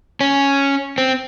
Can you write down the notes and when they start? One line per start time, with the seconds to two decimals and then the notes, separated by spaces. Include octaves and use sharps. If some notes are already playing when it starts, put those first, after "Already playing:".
0.21 C#4
0.98 C4